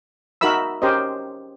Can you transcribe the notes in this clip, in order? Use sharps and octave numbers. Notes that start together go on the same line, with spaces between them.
D#4 F#4 A#4 E5 B5 E6
C#4 G4 A#4 C5 D#5